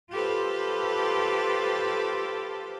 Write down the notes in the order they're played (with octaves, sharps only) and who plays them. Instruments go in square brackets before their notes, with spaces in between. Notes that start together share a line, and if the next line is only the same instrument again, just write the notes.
[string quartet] F4 G4 A4 B4 C5